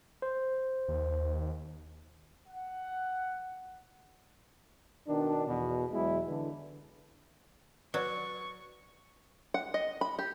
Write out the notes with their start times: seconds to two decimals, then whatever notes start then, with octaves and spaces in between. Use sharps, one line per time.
0.22 C5
0.88 D#2
2.48 F#5
5.07 B2 D#3 D4
5.47 E2 B2
5.92 E2 F#3 G#3 E4
6.26 D3 E3
7.94 F#3 B4 D5 C#6
9.54 F#5
9.74 D#5
10.01 B5
10.19 G4